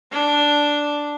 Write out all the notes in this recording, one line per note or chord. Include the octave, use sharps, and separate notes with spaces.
D4